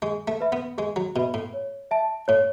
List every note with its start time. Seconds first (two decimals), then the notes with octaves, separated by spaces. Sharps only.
0.02 G#3 G#4
0.28 A3
0.41 B4 E5 B5
0.52 B3
0.78 G#3 G#4
0.96 F#3
1.16 B2 B4 E5 B5
1.34 A2
1.54 C#5
1.91 E5 A5
2.28 A2 C#5